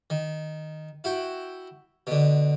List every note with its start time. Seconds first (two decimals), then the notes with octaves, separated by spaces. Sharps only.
0.10 D#3
1.04 E4 F#4 G5
2.07 B2 D3